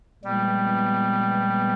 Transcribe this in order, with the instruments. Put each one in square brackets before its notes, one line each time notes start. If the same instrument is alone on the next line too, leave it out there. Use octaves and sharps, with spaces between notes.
[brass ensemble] A#2 F3 G#3 B3 [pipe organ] G3